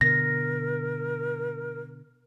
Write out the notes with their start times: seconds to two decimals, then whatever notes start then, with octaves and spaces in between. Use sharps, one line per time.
0.01 B2 D3 B3 A#4 A#6